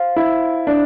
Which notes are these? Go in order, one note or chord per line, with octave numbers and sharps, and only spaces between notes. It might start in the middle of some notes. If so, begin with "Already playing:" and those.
Already playing: F4 C5 F5
E4
D4